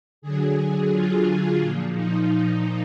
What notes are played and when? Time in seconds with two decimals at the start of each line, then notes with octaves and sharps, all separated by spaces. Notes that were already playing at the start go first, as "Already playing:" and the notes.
0.22 D3 F#3 G#4
0.91 F4
1.60 A#2 F3
1.94 D#4